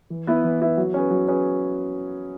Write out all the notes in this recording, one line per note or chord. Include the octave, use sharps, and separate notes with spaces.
E3
B3 E4 B4
E3
B3 E4 B4
F#3
C#4 G#4 B4
F#3
C#4 G#4 B4